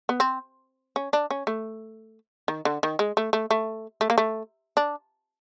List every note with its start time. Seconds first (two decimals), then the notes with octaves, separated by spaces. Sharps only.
0.09 B3
0.20 C4
0.96 C#4
1.13 D4
1.31 C#4
1.47 A3
2.48 D#3
2.65 D3
2.83 D#3
2.99 G#3
3.17 A3
3.33 A3
3.51 A3
4.01 A3
4.10 A#3
4.18 A3
4.77 D4